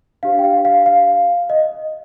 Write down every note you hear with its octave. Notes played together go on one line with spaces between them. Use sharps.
D4 G4 C5 F5
G5
F5
F5
F5
D#5